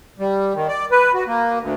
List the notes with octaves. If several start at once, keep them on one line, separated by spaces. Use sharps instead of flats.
G3
D#3
D5
B4
F#4
A#3
D2